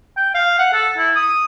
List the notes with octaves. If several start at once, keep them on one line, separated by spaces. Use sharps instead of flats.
G5
F5
F#5
A4
E4
D#6